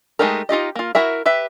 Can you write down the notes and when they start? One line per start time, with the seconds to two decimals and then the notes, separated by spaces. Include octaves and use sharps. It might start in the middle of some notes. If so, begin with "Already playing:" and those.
0.19 G#3 A3 D#4 G4 A#4
0.49 D#4 F4 G4 D#5
0.75 A#3 F4
0.95 E4 F#4 A#4 E5
1.26 G4 B4 E5